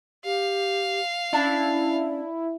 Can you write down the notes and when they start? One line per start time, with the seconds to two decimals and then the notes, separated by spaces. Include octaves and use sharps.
0.24 G4 F5
1.33 C#4 D4 E4